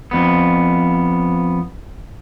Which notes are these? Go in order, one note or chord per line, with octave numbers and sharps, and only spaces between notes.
F2 B3